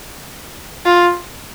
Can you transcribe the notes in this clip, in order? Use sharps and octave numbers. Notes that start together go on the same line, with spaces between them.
F4